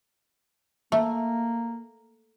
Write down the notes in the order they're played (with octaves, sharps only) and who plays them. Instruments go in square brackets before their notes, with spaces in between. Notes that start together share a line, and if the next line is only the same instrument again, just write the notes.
[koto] A3 [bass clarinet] A#3